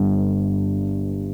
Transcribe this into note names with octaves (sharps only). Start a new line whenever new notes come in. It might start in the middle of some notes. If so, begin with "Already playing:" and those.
Already playing: G1 G2